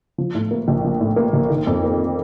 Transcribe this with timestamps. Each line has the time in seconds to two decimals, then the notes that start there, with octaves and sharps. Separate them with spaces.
0.18 F3
0.35 A2
0.51 A#3
0.68 A#1
0.84 F3
1.00 A2
1.16 A#3
1.33 A#1
1.50 D#3
1.67 F2
1.83 A#3